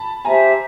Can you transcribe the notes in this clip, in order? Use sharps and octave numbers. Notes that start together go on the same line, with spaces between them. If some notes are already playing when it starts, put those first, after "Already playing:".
Already playing: A5 B5
G4 C5 E5 G#5 A#5